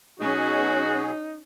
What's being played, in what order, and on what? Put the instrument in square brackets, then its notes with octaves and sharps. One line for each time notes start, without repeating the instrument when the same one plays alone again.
[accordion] B2 F#3 G#4 [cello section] C#4 [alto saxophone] D#4 [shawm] F#4